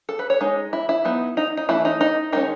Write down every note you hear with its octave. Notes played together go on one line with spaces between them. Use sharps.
A4
B4
C#5
G#3 D#4
E4
E4
F#3 B3 D#4
D#4
D#4
E3 A3 C#4 E4
D#4
D#4
D#3 G#3 C#4 D#4